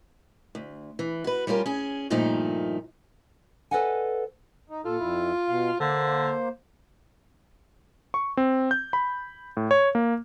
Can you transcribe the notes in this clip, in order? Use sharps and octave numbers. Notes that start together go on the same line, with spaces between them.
D2
E3
F#4 B4
G3 C#4 F4 G4 A#4
C#4 G#4
G2 A#2 D#3 F3 A3 D#4
A4 B4 D5 D#5 F#5 G#5
D#4
A#2 F4 A4
F2 E4
B2 F5
D3 A#3 C5
C#6
C4
G6
B5
A2
C#5
A#3